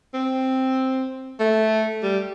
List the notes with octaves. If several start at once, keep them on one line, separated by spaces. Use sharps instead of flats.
C4
A3
G3